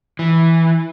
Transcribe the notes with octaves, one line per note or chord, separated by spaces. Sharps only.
E3